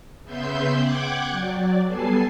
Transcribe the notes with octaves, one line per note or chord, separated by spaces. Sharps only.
C#3 B3 E5 C6 G6
F#5 G5 D6 F#6 G#6
F#3 D5
G3 B3 A4 G#5 A5 C7